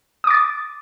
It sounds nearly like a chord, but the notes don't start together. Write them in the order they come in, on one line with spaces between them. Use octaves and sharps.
D#6 D6 A6